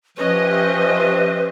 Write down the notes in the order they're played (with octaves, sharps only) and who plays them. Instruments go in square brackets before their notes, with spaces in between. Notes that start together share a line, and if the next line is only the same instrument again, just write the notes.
[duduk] F3 [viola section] C#4 D#5 [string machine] G4 C5 E5 [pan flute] B4